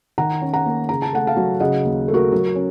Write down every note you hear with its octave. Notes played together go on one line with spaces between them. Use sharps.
D#3 F#5 A#5
C#4
F#5 A#5
A#3
C#3 A#5
A5
A3 F#5
F5 A5
F#3
C#3 D#5 F#5
D#2
A3
F#4 A#4
F#3
C#4